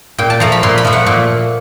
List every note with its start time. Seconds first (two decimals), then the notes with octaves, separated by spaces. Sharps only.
0.18 A#2 G5
0.30 A5
0.40 F3 A3 A#5
0.52 B5
0.63 A#2 C6
0.78 B5
0.85 F3 A3
0.93 F#5
1.06 A#2